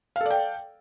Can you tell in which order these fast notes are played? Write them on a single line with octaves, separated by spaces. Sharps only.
F5 A4 D5 G5